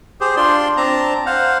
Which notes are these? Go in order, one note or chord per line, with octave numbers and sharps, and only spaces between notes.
G4 G#4 C5
D4 F4 D5 C6
C4 D4 A5 A#5
C5 F5 F#5